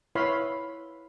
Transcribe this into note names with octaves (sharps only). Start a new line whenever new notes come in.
E4 B4 C#5 F5 B5 C6